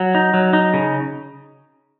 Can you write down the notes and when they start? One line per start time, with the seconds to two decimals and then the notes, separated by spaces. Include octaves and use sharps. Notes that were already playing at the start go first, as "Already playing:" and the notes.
Already playing: F#3 F#5
0.15 D#4
0.34 F#3
0.53 D#4
0.74 C#3